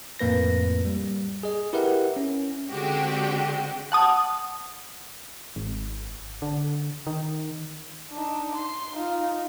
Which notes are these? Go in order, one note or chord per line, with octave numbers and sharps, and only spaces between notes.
F2 A2 A#3 B4 A#6
G3
G#4 D#5
E4 G4 A#4 B4 E5 F#5
C#4
D3 G#3 C4 F#4 G4 G5
F#5 A5 D#6
G#1
D3
D#3
D4 D#4
C6
D#4 F4